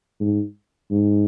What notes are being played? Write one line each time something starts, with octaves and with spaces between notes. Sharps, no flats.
G#2
G#2